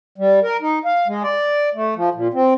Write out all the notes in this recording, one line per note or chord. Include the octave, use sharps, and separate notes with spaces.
G3
A#4
D#4
F5
G#3
D5
A3
F3
A#2
C4